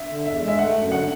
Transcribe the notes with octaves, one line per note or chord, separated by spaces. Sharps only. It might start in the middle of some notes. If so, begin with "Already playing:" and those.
Already playing: E5
D3
E2 E5
G#3
E5
A3 F#5
F#2
D3 F#5